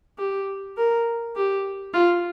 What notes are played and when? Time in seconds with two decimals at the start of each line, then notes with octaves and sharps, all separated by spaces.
0.18 G4
0.77 A#4
1.35 G4
1.93 F4